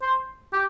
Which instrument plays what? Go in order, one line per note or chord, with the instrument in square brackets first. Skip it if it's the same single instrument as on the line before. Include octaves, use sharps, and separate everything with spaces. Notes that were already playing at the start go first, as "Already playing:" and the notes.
[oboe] C5
G4